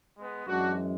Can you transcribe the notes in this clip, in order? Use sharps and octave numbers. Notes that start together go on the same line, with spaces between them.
G#3 B3
F#2 E3 G#3 D4 F#4